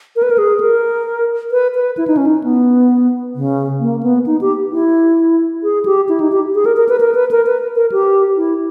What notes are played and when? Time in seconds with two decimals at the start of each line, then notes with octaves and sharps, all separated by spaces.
0.16 A#4
0.23 B4
0.30 A#4
0.38 G#4
0.60 A#4
1.52 B4
1.75 B4
1.97 E4
2.08 D#4
2.17 C#4
2.26 D#4
2.44 B3
3.35 C#3
3.80 A#3
4.03 B3
4.26 D#4
4.41 G4
4.72 E4
5.63 G#4
5.85 G4
6.09 E4
6.20 D#4
6.32 G4
6.55 G#4
6.66 A#4
6.77 A#4
6.89 B4
7.00 A#4
7.15 B4
7.31 A#4
7.46 B4
7.76 A#4
7.92 G4
8.37 E4